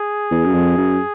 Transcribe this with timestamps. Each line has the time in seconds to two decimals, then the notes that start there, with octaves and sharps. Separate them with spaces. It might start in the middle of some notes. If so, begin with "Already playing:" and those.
Already playing: G#4
0.31 E2
0.45 F#2
0.54 F2
0.77 F#2